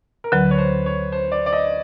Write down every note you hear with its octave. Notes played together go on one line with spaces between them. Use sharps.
A#4
D2 D3 F#3 B4
C#5
C5
C#5
C5
D5
D5
D#5